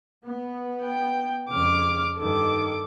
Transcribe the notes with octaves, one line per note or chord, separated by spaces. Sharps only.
B3
G5
F2 C#3 D6 F6
G2 D#3 A4 D6